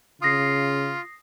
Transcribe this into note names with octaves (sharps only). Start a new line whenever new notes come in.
C#3 F4 D#6 A#6 C7